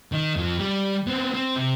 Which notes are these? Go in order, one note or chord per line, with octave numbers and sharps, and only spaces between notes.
D#3 D#4
F2 F3
G3
B3 C4
C4
C3